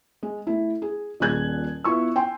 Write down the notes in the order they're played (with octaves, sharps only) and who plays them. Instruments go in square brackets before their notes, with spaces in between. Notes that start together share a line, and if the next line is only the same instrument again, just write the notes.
[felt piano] G#3
A3 E4
G#4
D#1 A#2 G#4 F#6 G#6
B3 E4 F4 C#6 E6
G5 G#5 C6